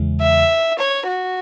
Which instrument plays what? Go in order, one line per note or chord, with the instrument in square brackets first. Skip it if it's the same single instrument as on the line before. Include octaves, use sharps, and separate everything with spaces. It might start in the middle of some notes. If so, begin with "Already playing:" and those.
Already playing: [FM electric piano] E2 C#3 E3 G#3
[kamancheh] E5
C#5
F#4